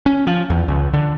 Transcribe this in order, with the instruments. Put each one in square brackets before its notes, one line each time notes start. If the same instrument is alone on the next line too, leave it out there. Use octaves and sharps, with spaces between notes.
[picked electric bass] C#4
F3
E2
C#2
D3